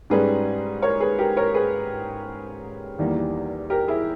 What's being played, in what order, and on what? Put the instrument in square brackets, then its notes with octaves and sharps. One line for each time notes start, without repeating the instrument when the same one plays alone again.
[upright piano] G#2 G3 C#4 G#4 B4
A#4 C#5
G#4 B4
G4 A#4
A#4 C#5
G#4 B4
E2 D#3 G3 A#3
G4 A#4
E4 G#4